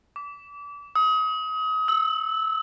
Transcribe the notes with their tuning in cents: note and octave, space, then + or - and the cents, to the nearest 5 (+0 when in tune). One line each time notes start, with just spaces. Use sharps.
D6 -30
D#6 +35
E6 -15